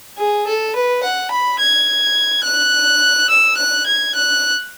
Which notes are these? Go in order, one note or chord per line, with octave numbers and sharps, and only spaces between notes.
G#4
A4
B4
F#5
B5
G#6
F#6
E6
F#6
G#6
F#6